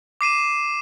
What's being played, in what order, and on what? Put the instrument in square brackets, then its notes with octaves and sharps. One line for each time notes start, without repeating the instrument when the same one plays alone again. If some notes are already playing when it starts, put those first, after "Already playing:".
[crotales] D6 C7 D#7 E7